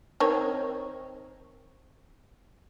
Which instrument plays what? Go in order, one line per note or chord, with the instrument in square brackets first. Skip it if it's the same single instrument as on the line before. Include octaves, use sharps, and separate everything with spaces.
[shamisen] D#3 C4 C#5